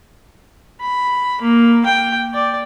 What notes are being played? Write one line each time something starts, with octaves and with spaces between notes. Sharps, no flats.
B5
A#3
G5
D5